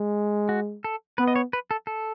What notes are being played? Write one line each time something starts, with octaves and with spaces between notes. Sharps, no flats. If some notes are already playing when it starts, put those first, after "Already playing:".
Already playing: G#3
F#4
A4
B3 B4
D#5
C#5
B4
A4
A4